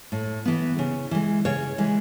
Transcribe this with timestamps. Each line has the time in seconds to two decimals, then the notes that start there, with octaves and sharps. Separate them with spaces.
0.12 A2
0.45 E3 B3
0.79 C#3
1.11 E3 G#3
1.45 C#3 C#5
1.78 E3 G#3